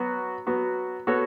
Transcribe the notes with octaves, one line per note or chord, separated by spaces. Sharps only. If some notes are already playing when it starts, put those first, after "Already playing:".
Already playing: F#3 B3 F#4
F#3 B3 F#4
B3 F#4 A4 C#5